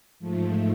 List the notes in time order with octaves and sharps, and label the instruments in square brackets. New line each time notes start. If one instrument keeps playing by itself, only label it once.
[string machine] G#2 F3 A3